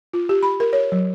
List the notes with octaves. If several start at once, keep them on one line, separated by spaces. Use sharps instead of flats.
F4
G4
B5
A#4
C#5
F#3